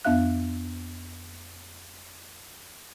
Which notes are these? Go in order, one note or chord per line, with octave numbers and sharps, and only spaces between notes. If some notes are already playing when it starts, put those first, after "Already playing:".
F2 B3 D4 E5 F5 F#6